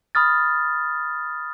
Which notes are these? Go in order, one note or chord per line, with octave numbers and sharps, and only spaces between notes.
B5 D#6 F6 A6